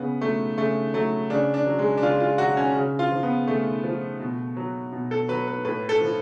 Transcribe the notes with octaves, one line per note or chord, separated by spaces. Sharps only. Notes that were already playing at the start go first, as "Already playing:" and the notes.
Already playing: C#3 B3
F#3 A3
C#3 A3
F#3 A3
C#3 D4
D4
F#3
G#3
D4
C#3 F4
F4
F#3 F#4
C#4
C#3
F4
F3
B3
C#3 A3
F3
B2
F#3
B2
A4
F#3 B4
B4
A2 B4
A4
F3